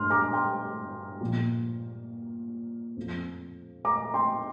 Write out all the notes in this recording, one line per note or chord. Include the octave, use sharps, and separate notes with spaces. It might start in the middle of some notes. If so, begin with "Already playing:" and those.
Already playing: G2 C6 F6
A#5 D6
G5 C6
A#2 F3
F2 F3
A#5 D6
G5 C6